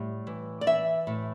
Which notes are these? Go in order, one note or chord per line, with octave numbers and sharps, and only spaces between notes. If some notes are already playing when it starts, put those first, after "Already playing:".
Already playing: A2 G3
E3
D5
E3 E5
A2